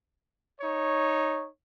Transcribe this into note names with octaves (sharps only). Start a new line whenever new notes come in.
D#4 C#5